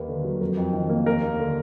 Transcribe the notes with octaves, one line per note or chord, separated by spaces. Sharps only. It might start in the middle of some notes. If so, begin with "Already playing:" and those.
Already playing: D#2 A#3 B4
D3
F#3
F2 A#4
F2
D#3
A#3
D#2 A#4
A#3
D3